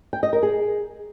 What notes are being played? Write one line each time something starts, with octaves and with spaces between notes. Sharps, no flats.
G5
D#5
A#4
G#4